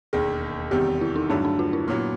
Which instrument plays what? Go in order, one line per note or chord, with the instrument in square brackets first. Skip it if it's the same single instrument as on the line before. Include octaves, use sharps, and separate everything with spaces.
[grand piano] E1 D#2 D#3 [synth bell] G#4
[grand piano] E2 C3 D#3 G3 [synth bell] G4
[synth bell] E4
D#4
[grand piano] G2 D3 F#3 A3 [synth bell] D4
[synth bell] D4
F4
E4
[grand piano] A#2 F#3 B3